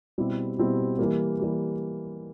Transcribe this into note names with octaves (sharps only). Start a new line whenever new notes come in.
B2 G3 C4 E4 G4
B2 G3 C4 E4 G4
E3 G3 A#3
E3 G3 A#3